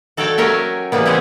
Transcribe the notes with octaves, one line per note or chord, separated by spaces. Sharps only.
F#4 A4 C#5 D5 F5 G5
F#3 C#4 G4 A#4 C#5 E5
C#3 E3 G3 A#3 B3
C#4 E4 G4 G#4 C5 C#5